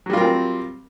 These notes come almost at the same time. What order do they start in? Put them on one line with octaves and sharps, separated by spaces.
F#3 G3 F4 A#4 C4